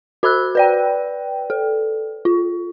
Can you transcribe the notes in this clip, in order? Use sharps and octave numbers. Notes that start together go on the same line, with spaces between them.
F#4 C5 B5 E6 F#6
B4 D5 G5
A4
F4